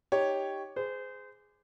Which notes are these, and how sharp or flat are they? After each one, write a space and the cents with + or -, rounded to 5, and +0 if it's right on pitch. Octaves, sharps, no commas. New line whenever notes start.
D#4 +0 G4 +0 C#5 +0
G#4 +0 C5 -30